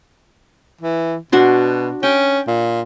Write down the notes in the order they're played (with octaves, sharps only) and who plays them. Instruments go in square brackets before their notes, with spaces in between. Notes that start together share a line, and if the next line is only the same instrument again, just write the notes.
[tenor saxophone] E3
[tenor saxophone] B2 [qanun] D4 F#4 C6
[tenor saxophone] C#4 [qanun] G5
[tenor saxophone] A#2